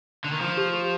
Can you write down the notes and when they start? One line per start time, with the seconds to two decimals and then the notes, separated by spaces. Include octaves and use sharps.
0.24 D3
0.32 D#3
0.40 F3 D4
0.57 G4
0.74 G4